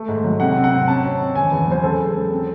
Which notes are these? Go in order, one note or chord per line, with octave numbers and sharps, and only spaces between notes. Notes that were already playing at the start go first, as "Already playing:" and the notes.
Already playing: A3
G#2
F#3
C3 F#5
C4
F#5
C4
C#4 A5
C#4
C3
E2 G#5
E2
F#3 C5
C#3 A4
G#3
C#3
C4